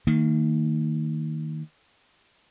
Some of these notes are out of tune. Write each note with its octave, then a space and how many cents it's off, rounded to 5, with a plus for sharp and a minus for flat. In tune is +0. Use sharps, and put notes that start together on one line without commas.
D#3 +0 A#3 -35